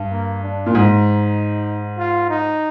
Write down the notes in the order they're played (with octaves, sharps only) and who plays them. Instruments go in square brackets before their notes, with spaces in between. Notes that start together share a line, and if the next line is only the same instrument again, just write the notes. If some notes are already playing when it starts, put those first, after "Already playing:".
Already playing: [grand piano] G2
[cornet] A#3
D4
[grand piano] A#2
[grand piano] G#2 [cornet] D#4
[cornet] F4
D#4